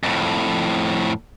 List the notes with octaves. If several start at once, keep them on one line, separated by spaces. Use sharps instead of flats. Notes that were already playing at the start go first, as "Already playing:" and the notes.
F2 A2